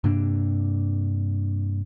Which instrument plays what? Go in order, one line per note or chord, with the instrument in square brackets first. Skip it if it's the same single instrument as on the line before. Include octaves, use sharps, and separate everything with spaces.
[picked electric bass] G2 C3 A#3 D4